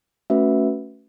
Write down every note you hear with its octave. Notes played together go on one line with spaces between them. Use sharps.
A3 C#4 F#4 B4 E5